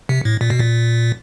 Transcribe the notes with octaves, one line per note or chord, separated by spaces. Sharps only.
C3
A2
A#2
B2
A#2